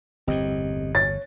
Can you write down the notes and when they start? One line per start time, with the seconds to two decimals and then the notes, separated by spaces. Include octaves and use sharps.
0.28 G1 E2 A2 C4 G4 D#5
0.95 C#5 A6